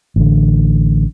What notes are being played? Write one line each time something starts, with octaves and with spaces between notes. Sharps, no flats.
A1 D3